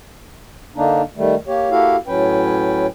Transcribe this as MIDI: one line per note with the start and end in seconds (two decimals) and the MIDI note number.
0.76 1.02 50
0.76 1.02 58
0.76 1.02 62
0.76 1.02 63
1.17 1.35 51
1.17 1.35 55
1.17 1.35 57
1.47 1.70 58
1.47 1.70 67
1.47 1.70 73
1.71 1.96 58
1.71 1.96 64
1.71 1.96 66
1.71 1.96 67
1.71 1.96 69
1.71 1.96 77
2.07 2.86 45
2.07 2.86 54
2.07 2.86 61
2.07 2.86 71
2.07 2.86 79